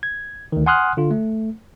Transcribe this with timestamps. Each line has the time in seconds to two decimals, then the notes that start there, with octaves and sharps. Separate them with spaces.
0.03 G#6
0.52 D2 D#3
0.66 F#5 G#5 C6 D#6 F6 F#6
0.97 D3 F4
1.11 A3